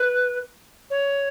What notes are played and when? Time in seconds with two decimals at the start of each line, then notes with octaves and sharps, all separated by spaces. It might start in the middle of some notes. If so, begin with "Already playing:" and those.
Already playing: B4
0.90 C#5